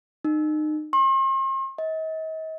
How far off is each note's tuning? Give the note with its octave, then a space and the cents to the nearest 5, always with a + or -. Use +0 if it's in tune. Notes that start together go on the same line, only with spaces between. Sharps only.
D#4 -30
C6 +45
D#5 +40